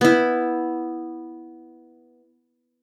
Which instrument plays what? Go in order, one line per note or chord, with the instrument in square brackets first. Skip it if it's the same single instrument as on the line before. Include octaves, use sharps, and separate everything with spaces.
[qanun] B3 E4